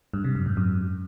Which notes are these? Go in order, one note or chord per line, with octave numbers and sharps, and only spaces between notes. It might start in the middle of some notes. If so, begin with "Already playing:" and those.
G2
C3
F#2
G#2
F#2